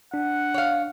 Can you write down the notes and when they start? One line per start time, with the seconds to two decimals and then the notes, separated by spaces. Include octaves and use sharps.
0.14 D4 F#5
0.54 C#5 F5